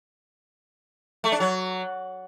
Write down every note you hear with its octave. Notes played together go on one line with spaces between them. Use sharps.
A3
D4
F#3